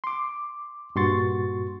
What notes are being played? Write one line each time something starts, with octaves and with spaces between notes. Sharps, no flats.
C6 D6
G2 A#2 F#4 C6 C#6 A6